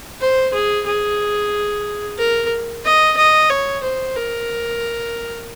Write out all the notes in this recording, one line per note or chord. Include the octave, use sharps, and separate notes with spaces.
C5
G#4
G#4
A#4
D#5
D#5
C#5
C5
A#4